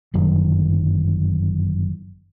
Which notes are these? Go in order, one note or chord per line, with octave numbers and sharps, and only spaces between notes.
G1 F#2 D#3 F#3